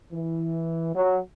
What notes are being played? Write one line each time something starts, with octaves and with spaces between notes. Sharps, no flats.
E3
F#3